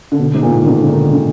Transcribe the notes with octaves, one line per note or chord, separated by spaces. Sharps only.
D3
B2
G#2
A#2
D#3
D3
D3
D#3
D3